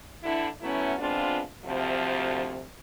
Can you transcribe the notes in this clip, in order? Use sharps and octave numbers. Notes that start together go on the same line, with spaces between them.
D3 E3 D4 E4
F#3 A3 B3 C#4 E4
G#3 B3 C4 D4 F4
D2 C3 F3